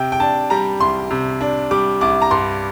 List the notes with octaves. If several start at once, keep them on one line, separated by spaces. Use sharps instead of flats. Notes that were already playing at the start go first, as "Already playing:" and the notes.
Already playing: C3 G5
G5
D4 A5
G3 A#5
C2 C6
C3
D4
G3 D6
C2 D6
A#5
G2 C6